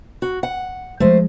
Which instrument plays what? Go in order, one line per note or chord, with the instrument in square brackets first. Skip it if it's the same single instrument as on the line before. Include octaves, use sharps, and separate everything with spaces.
[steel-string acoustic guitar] F#4
F#5
[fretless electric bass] F3 F#3 G#3 [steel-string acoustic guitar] A3 C5